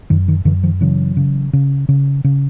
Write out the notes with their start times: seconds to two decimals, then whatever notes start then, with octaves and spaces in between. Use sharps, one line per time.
0.10 F#2 D#3
0.28 D#3
0.45 F#2 D3 E3
0.63 D#3 F3
0.81 C#3 E3 F#3
1.17 C#3
1.53 C#3
1.89 C#3
2.24 C#3